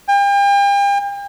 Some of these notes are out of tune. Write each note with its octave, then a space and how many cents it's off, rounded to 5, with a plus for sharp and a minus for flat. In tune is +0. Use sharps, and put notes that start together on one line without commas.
G5 +40